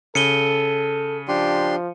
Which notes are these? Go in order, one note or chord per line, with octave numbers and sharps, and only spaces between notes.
C#3 A4 C#7 D#7 G7
F3 D4 G4 C6